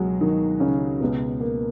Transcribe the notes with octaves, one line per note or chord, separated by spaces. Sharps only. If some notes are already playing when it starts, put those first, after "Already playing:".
Already playing: C#2 B2 F#3 G#3 F#4 G#4
D#3 D#4
C#3 C#4
C#2 B2 B3
A#3